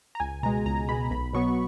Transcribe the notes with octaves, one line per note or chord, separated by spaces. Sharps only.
A#5
C#2 G#5
B2 G#3 A#5
C#2 A#5
B2 G#3 B5
B1 B5
B2 F#3 B3 C#6